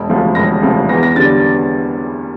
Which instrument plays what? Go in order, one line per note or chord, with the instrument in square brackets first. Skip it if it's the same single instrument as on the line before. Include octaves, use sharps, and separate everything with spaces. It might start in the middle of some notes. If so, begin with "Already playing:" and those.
Already playing: [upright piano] E1
D2 C3 F3
E1 A#6
D2 C3 F3
E2 A#6
A#6
D3 G3 A6